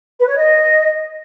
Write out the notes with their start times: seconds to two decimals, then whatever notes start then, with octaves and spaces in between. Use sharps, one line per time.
0.18 B4
0.27 C#5
0.36 D#5